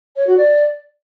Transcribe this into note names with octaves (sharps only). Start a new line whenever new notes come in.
C#5
F#4
D5